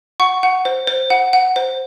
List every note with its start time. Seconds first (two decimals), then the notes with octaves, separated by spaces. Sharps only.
0.20 F#5 C#6
0.43 F#5
0.65 C5
0.87 C5
1.10 F#5
1.33 F#5
1.56 C5